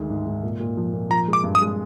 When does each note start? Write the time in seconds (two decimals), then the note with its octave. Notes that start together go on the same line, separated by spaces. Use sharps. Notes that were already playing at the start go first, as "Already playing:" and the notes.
Already playing: D2 D#3 G#3
0.10 G#2
0.27 G#2
0.43 A#2
0.60 A#2
0.77 F3
0.93 A#2
1.10 F3 A#5
1.28 G#3
1.33 D6
1.44 G2
1.55 D#6
1.61 G#3